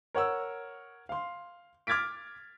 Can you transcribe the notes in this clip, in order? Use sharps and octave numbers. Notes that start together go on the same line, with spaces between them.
A#4 C#5 F#5 E6
F5 C6
D6 F6 G#6 A6 B6 D7